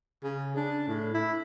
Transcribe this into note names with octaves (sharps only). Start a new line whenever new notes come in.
C#3
D4
A2
E4